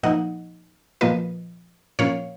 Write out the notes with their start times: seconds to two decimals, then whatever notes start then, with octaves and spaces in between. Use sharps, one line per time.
0.03 A#2 F3 A#3 D#4 D#5 F#5
1.01 A#2 F3 A#3 F4 B4 D#5
1.99 A#2 F3 A#3 C#4 C#5 F5